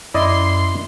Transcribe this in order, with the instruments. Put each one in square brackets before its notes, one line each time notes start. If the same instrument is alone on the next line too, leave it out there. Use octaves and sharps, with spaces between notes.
[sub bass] F#2 [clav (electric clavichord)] E4 D5 D#5 [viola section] C6